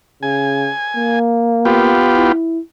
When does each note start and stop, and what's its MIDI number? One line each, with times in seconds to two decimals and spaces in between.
0.23 0.69 49
0.23 1.19 80
0.96 1.96 58
1.65 2.32 59
1.65 2.32 65
1.65 2.32 67
2.14 2.59 64